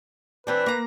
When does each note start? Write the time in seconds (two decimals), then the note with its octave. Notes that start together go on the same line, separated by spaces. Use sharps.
0.47 E3 C4 D4 B4
0.66 A#3 A#5